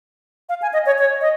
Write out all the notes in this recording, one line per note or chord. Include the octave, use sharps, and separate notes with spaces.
F5
G#5
D#5
C#5
C#5
D#5